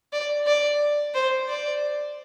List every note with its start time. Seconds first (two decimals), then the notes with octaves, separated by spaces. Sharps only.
0.13 D5
0.47 D5
1.14 C5
1.49 D5